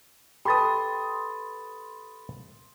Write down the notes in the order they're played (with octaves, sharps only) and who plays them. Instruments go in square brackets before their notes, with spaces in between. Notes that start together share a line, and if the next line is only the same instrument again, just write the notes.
[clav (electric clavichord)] G4 A4 B4 [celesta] B5 A6 [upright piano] C6 D#6